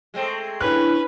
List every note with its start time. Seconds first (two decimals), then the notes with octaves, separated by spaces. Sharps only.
0.14 G#3 A3 C4
0.61 C#4 D4 E4 B4 C#5 F#6